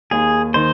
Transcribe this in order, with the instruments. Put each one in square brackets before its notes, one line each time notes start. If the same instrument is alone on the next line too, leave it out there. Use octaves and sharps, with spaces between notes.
[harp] D#2 [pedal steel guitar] G#4
[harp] D#3 [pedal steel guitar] C5